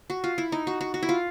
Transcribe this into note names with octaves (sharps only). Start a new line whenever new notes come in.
F#4
F4
E4
D#4
F#4
F#4
F#4
E4
F4